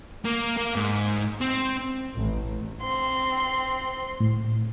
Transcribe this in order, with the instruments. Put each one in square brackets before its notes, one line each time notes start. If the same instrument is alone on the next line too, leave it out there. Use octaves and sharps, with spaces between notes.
[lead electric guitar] A#3
A#3
G#2
C4
[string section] A1
[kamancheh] C4 C6
[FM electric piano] A2